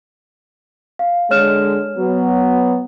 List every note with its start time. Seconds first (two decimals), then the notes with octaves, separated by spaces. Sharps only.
0.99 F5
1.31 D3 G#3 C#5 F6 E7
1.98 F#3 B3